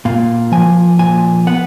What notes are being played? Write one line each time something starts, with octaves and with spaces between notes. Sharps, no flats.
A#2 F5
F3 G#5
A#2 G#5
B3 F#5